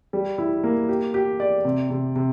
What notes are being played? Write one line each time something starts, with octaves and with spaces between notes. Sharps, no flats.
G3
E4
A#3
G4
G4
D5
C3
C3
C3